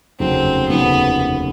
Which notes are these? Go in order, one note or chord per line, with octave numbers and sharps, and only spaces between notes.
F1 D#2 C#3 F#3 A3 C4
F1 D#2 C#3 F#3 A3 B3